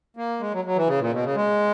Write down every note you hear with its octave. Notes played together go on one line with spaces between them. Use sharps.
A#3
G#3
F#3
F#3
E3
C#3
A#2
B2
C#3
G#3